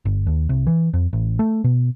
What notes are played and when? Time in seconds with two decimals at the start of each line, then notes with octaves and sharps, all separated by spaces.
0.05 G1
0.27 D#2
0.49 C2
0.67 E3
0.93 F2
1.13 A1
1.39 A3
1.64 B2